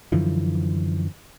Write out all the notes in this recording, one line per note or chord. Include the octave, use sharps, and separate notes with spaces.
F#2 D3 E3 F3